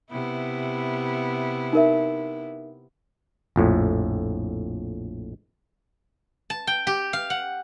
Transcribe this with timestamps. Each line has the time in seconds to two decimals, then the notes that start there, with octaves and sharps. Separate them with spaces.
0.11 C3 B3 E4
1.73 D#4 A#4 E5
3.56 A#1 F2 A2
6.50 A5
6.67 G5
6.87 G4
7.13 F5
7.30 F#5